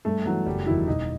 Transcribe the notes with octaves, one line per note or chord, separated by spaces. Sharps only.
G2 A3
E3 F#3 B3
F#1 G3
E2 D#3 F#3 E4
E1 D#4